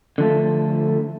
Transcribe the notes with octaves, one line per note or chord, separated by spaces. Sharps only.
D3 F3 A3